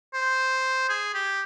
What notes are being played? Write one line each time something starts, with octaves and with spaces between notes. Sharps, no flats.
C5
G#4
G4